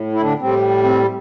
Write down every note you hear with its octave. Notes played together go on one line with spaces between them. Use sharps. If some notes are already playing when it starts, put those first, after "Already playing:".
Already playing: A2
E4
D3 D4
A2 G3 C4
C4